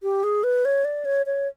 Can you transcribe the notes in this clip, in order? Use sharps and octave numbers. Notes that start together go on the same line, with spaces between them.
G4
G#4
B4
C#5
D5
C#5
C#5